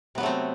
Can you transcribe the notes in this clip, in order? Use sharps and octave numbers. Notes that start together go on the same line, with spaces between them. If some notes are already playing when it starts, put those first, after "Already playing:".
C3 F#3 A3 B3 C4